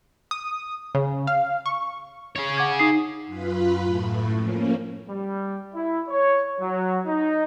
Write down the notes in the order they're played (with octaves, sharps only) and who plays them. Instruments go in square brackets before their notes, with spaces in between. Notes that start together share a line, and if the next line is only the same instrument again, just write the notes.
[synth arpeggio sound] D#6
C#3
F5
C#6
[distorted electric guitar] G#4 C#5
[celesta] F#5 D6 G#6
D#4 D#6 C7
[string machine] F#2 F4 B4 B5
A2 A3
F3 A#3 C#4
[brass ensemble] G3
E4
C#5
F#3
D#4